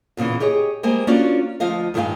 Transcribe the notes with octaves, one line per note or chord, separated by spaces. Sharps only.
E2 A#2 C#3 E3
G4 G#4 C#5 D#5
G3 G#3 A#3 C5 G#5
A#3 C#4 D4 F4 F#4 D5
D2 F3 F4 D#5 F5
G2 D#3 G4 G#4 F5 G#5